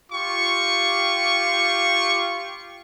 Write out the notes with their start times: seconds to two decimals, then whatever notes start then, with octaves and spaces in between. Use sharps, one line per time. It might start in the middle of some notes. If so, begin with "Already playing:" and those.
0.12 F4 G4 C#6